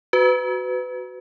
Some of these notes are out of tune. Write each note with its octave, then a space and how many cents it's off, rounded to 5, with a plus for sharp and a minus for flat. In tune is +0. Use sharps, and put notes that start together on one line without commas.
F#4 +5 B4 +25